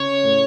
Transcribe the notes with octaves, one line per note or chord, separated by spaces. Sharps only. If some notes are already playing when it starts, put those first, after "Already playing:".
Already playing: C#3 C#5
A2